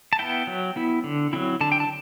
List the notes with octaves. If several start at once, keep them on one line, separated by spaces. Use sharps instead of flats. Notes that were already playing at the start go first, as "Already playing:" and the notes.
A5
B3 E4 G5
F#3
B3 E4
D3
F#3 C4 E4
D3 A5
G5
A5